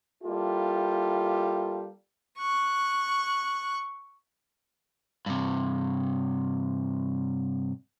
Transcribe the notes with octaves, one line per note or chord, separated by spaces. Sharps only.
G3 A#3 E4 F4 G4 A4
C#6 F#6
G2 C3